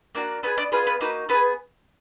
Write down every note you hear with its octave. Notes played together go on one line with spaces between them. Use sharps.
A#3 D4 F#4
B3 D#4 G#4 B4
D4 D5
B3 F4 G#4 B4
B4
A#3 D#4 F#4 B4
B3 D4 G#4 B4